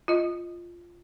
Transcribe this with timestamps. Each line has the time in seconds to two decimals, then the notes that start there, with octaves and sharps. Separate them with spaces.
0.08 F4 D#5